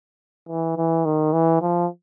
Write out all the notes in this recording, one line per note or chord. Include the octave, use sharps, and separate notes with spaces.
E3
E3
D#3
E3
F3